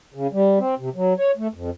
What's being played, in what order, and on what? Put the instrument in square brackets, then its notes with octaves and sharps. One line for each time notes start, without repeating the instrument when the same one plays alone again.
[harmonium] C#3
G3
C4
C3
F#3
C#5
A3
F2